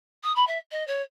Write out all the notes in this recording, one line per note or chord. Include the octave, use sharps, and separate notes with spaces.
D#6
B5
E5
D#5
C#5